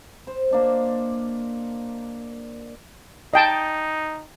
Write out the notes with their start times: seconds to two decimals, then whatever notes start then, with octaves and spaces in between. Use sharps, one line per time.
0.27 C5
0.51 A#3 D4 D#5
3.34 D#4 D#5 G5 A5